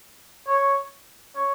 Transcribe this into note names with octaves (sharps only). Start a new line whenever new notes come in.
C#5
C#5